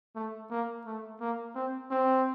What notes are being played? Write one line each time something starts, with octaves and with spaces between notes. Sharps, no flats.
A3
A#3
A3
A#3
C4
C4